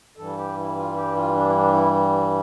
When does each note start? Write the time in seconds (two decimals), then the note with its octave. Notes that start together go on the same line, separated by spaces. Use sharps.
0.16 G2 E3 G3 A4
0.37 G4
0.57 E4
0.76 F4
0.95 G4
1.15 F4
1.34 D4
1.49 E4
1.54 D4
1.74 E4